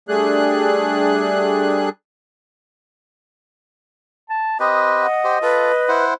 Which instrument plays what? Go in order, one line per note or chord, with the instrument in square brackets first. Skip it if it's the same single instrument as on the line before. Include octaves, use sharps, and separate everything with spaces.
[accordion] G3 A3 D4 G#4 F#6
[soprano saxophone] A5
[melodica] C4 G4 B4 [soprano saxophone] D#5 [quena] D#6
[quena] F#5
[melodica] G4 C5
[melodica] F4 A4 [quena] B4
[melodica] E4 C5 F#5